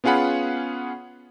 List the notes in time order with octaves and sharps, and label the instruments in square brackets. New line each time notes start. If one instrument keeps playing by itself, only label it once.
[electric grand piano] B3 C#4 F4 G#4 F#5 B5